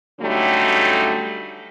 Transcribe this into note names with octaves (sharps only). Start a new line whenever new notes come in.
D3 F#3 G3 A3 C#4 D#4